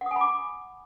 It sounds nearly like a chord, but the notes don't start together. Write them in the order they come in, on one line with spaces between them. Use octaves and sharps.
F#5 D#6 G#5 B5 D6